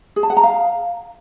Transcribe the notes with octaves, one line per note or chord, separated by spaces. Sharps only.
G#4
A5
F#5
A#5
F5